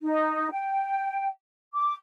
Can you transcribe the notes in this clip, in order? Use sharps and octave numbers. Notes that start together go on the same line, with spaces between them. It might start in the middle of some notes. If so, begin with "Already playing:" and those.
D#4
G5
D6